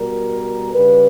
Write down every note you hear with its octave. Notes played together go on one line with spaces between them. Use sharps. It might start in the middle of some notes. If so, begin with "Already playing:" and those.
Already playing: B2 G3 A#4
C#3 G3 B4